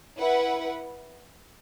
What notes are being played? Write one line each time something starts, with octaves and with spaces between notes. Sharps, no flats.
E4 B4 F#5